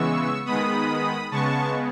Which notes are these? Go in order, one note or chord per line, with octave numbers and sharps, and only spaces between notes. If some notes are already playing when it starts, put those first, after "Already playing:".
Already playing: C#3 E3 G#3 B3 C#6 E6
D#3 G#3 B3 B5 D#6
C#3 G#3 B3 A5 C#6